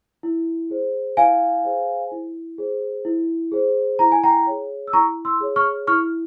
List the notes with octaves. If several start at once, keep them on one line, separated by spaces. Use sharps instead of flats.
E4
G#4 C5
E4 F5 G#5
G#4 C5
E4
G#4 C5
E4
G#4 C5
E4 A#5
G#5
G5 A#5
G#4 C#5
E6
E4 A#5 C#6
C6 E6
G#4 C#5
C#6 F6
E4 C#6 F6